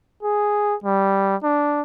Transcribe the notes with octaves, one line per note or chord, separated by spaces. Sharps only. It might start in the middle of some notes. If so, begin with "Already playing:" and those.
G#4
G3
D4